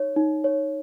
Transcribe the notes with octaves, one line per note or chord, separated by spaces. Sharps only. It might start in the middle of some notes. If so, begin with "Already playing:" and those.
Already playing: D#4 C#5
D#4
C#5